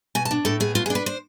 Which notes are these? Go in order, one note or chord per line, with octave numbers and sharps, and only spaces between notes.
B2 G#5
A5
D4
A2 A4
B3 G#4
B2 F4
G#4
D4
B4
C5